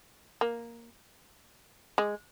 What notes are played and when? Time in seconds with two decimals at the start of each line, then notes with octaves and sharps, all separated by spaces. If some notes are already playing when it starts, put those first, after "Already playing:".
0.41 A#3
1.98 G#3